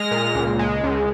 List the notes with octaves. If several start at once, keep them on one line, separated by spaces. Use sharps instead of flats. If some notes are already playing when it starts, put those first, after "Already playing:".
Already playing: G#3 F6 A#6
A#2
C#2
G#3
C#2